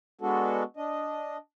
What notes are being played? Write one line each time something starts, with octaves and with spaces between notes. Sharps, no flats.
G#3 B3 D4 F#4 A4
D4 D#5